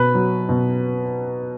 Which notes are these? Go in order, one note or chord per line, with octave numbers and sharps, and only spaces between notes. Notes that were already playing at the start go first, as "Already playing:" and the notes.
Already playing: B2 B4
F#3
B2